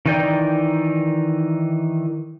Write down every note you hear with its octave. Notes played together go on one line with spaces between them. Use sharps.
D#3 E3 D#4 D5 G5